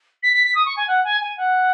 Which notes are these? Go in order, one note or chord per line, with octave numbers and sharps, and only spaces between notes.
B6
B6
B6
D#6
C#6
G#5
F#5
G#5
G#5
F#5